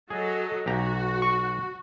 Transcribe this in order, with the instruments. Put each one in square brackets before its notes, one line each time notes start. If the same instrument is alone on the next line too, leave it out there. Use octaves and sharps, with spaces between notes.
[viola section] F#3 A4 D#5 [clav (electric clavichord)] G#4
[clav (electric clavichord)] B1 G4 A#5 [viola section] F#4
[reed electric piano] C#6